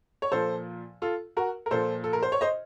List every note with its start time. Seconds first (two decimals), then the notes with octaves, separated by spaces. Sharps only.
0.22 C#5
0.32 A#2 F3 A4 C5
1.02 F4 A4
1.37 F#4 A#4
1.66 A#4
1.71 A#2 F3 A4 C5
2.04 A4
2.13 A#4
2.23 C5
2.32 C#5
2.41 C5 D#5